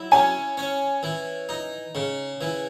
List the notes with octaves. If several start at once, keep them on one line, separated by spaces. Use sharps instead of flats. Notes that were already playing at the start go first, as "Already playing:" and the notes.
Already playing: F#3 E4
C#4 G#5
C#4
E3
D#4
C#3
E3